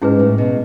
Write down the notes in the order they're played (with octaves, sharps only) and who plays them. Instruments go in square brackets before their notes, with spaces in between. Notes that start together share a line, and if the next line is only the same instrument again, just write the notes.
[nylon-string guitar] G#2 [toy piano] C#4 E4 G#4 B4
[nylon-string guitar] A2
B2